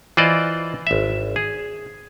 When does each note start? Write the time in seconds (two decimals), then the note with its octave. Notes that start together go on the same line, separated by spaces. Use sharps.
0.17 E3 F4 C5 D5 D#5
0.87 G#1 E5
1.36 G#4